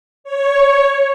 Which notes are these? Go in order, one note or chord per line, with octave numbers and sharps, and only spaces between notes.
C#5